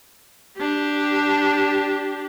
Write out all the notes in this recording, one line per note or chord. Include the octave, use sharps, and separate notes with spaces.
D4 G4